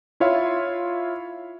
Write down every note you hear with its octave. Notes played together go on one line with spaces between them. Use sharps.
E4 F4 C#5 E5 F5